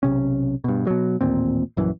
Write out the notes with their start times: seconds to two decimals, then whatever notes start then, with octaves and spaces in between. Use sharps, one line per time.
0.03 B1 C3 C#4
0.64 G2 B2
0.87 B2 F#3
1.21 A1 D#2 A#2 C4
1.77 A#1 F#2 E3